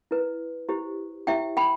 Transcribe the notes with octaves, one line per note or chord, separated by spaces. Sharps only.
E4 B4
E4 G4 C5
E4 G4 C5 E5 G5
G5 B5